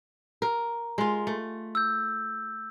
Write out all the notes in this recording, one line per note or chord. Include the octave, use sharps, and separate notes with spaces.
A#4
G#3 F4
A3
E6 G6